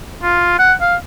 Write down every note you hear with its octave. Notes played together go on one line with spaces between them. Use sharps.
F4
F#5
F5